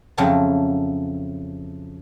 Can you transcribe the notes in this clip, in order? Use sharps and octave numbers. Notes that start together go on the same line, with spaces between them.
F2 C#3 F#3 E4 A5